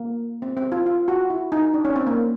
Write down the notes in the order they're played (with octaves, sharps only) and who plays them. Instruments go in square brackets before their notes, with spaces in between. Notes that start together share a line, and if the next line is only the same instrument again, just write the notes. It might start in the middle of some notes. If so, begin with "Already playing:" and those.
Already playing: [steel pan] A#3
C4
C4
F4
F4
F#4
E4
D#4
D4
C#4
C4
A#3